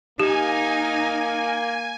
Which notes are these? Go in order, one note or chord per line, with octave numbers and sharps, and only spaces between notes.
A#3 D#4 G4 G#5